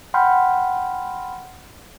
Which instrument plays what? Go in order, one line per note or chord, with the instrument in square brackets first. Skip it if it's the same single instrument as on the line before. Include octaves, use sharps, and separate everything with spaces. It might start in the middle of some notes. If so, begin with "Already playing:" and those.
[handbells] F#5 G5 B5 C6 F6 G6